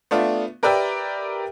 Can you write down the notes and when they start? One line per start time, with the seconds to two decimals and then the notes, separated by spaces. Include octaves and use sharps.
0.11 A3 B3 D4 F4
0.63 G4 A#4 B4 D5 E5 G5